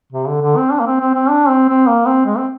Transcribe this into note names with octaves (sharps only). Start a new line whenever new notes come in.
C3
D3
D3
C4
D4
A#3
C4
C4
C4
D4
C4
C4
A#3
C4
G#3
C4